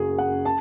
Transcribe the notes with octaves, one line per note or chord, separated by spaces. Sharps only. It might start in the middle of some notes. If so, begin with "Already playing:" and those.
Already playing: F#1 F#2 C#3 F#4 G#4
F#5
A5